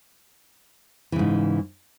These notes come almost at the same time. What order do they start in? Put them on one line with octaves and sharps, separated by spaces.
E3 C#3 G#2